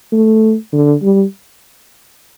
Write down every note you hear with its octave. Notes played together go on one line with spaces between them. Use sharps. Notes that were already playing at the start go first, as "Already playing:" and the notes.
A3
D3
G3